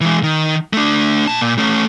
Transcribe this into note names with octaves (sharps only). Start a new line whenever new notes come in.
E3 G#3
D#3
A3 D4
A#2 A5
A#2
A3 C#4